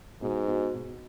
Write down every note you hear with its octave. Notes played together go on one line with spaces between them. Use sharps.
G#2 B2
B2
B2